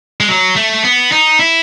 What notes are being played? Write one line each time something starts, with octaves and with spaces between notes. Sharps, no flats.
G#3
F#3
A3
B3
D#4
E4